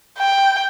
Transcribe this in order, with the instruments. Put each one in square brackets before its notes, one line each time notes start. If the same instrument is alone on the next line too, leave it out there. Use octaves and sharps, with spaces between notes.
[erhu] G5